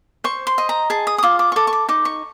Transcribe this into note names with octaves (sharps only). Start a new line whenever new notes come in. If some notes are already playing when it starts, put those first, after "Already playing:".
C5 C#6
C6
D#5
A#5
G#4 A5
D#6
D#6
F4 D6
D6
C#6
A4 D6
C#6
D6
D#4 D6
C#6